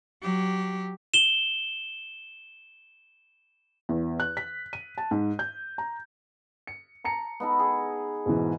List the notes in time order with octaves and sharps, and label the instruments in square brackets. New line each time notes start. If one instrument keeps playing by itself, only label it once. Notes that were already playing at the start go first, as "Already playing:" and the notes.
[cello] F#3 G4
[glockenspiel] E7 G7
[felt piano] E2
F#6
B6
D#7
A5
G#2
G6
A#5
[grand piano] C#7
A5 A#5 C#7
[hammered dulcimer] B3 D#4 A4
G#4
[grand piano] G#2 B2 E3